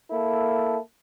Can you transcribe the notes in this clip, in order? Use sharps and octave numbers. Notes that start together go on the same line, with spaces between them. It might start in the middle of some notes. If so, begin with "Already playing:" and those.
A#3 E4 A4